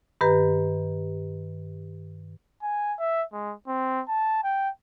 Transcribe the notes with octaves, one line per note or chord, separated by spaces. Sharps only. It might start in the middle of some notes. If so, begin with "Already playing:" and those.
G2 D#3 G4 B4 A#5
G#5
E5
G#3
C4
A5
G5